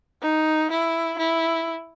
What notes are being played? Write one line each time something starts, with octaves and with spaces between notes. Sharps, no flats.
D#4
E4
E4